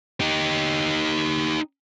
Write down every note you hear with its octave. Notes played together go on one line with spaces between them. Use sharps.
D#4 G4